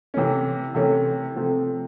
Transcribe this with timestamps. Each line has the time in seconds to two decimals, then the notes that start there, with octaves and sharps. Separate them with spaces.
0.14 C3 E3 A3 C#4
0.75 C3 E3 A3 C#4
1.36 C3 F3 A3 C4